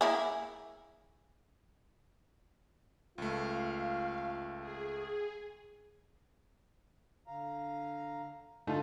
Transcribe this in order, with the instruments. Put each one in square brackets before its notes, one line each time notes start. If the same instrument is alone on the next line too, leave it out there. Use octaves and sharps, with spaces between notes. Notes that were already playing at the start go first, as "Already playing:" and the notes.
[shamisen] A#3 E4 G#4
[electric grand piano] C#2 A3 [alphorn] F4 [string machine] F5
[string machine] G#4
[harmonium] D3 F5 A#5
[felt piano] D3 D#4 A5 [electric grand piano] A3 F4